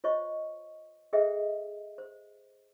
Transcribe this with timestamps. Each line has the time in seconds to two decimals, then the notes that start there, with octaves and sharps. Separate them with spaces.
0.04 F4 C5 C#5 D#5 C#6
1.13 G#4 A4 C5 D#5 E5 G5
1.98 C5